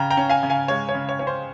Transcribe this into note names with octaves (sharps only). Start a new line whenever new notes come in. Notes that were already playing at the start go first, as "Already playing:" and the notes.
Already playing: C#3 G5 A#5
G5 A#5
C#4
F5 G#5
C#3
F5 G#5
G#3 C#5
C#5
C#3
C#5
C#4 C#5
C5